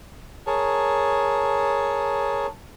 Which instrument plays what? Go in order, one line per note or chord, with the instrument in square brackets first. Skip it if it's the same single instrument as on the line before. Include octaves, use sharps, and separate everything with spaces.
[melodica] G#4 A#4 C#5 A5